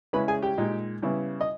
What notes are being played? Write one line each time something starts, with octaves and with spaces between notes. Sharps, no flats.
C#3 G#3 C#4 E4 B4 B5
G#4 G#5
G4 G5
A#2 G#3 D#4
C#3 G3 B3 E4
D#5